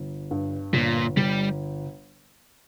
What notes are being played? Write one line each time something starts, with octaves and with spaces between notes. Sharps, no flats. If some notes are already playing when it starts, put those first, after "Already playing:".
Already playing: G1
G2
G1 A#2
G1 G3